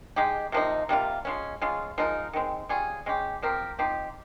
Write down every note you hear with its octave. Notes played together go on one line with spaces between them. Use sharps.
G#3 D#4 G4
C3 F3 A#3 D#4
C3 G3 A#3 F4
F3 G#3 C#4
F3 G#3 C#4 F4
F3 G#3 D#4 A#4
D#3 G#3 C4
G3 C#4 F4 G#4
G#3 C#4 G4
F3 C4 G4 A#4
F3 C4 D#4 G4